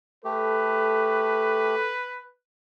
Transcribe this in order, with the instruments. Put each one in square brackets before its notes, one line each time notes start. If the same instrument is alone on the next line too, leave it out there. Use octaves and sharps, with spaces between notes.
[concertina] A3 G4 [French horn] A4 [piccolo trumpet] B4